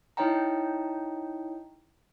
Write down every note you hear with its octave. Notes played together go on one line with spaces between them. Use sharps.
D#4 E4 C#5 D#5 G5 A#5